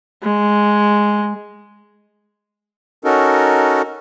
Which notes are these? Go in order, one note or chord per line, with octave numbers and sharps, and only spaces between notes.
G#3
C#4 D#4 F#4 A4 A#4